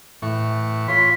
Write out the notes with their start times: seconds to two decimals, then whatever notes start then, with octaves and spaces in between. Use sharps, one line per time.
0.22 A2 E3 C#6
0.88 F4 C#5 C6 B6